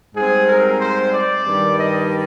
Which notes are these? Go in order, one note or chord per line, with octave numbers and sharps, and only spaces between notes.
G#2 G3 C4 G#4
A#4
C5
D5
G2 D#3 G3
D#5